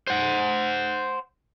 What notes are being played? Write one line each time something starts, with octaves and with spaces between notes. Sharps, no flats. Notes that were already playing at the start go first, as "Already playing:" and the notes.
C5 F#5